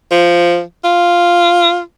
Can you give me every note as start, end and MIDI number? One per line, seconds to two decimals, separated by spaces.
0.11 0.61 53
0.84 1.80 65